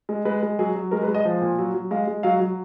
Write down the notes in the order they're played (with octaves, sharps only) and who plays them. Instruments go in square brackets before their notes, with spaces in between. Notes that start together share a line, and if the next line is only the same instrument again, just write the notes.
[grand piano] G#3
G#3 B4
G#3
F#3 G#4
F#3
G#3 A#4
B4
G#3
D#5
F3
A#2
F#3
F#3
G#3 F5
G#3
F#3 F5
F#3